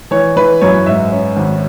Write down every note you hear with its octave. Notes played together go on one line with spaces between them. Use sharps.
E3 C#5
E3 B4
F#2 C#5
G#2 E5
C#4
G#1